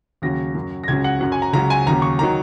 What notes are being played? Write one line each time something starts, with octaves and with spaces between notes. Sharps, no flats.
D#2 C#3 F#3 A#6
F#2 F#3
A#6
C#2 C#3 F#3 G#6
F#5
F#2 F#3 F#5
G#5
A#5
C#2 C#3 F#3 A#5
G#5
D#2 C#3 F#3 A#5
C#6
D#3 F#3 A#5